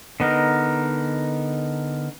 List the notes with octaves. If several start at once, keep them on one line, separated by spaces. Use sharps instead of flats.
D3 B3 D#4 A#4